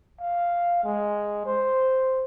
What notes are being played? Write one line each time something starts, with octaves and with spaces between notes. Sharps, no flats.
F5
G#3
C5